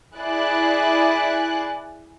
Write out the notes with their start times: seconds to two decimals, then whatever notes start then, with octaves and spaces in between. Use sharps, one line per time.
0.17 E4 G#4 D5 F#6